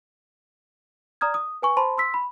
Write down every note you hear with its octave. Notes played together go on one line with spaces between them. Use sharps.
D5 A#5 D#6 F6 G#6
D#6
B4 G#5 C#6
C5 A5 B5 C6
C6 E6 B6
B5